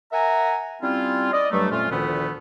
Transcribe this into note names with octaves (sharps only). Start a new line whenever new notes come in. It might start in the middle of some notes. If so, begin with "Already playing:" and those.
A#4 E5 F#5 G#5 A#5
G3 C4 C#4 E4 F4
D5 D#5
G2 F#3 G3 A3
F2 A#2 A3 C#4 F4
D2 A#2 D#3 F3 A3 B3